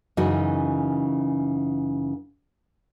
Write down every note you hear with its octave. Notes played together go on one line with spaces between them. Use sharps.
F#2 C#3 E3 D#4 F#4